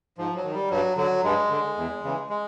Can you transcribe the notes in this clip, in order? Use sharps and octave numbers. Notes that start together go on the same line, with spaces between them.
G#2 F3
F#3
D#3
G3
G2 F#3
D3 F#3
G2 G#3
D3
E2
C#3 E3
G#3